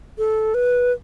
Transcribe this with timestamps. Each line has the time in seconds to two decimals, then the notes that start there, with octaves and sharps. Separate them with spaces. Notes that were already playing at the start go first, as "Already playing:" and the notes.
0.18 A4
0.54 B4